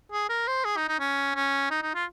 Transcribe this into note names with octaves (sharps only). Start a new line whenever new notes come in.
G#4
A#4
C5
G#4
D#4
D#4
C#4
C#4
D#4
D#4
F4